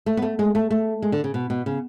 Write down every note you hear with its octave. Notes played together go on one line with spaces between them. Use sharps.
A3
B3
A3
G#3
A3
A3
G#3
D3
C#3
B2
B2
C#3